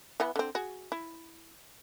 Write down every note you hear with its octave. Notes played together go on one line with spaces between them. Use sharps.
E3 B3 F#5
D3 C4
F#4 G#4
E4